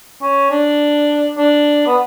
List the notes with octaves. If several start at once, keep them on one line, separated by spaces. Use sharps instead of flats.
C#4
D4
D4
B3